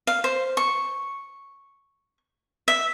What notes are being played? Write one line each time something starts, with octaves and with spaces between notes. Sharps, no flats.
F5
C5
C#6
E5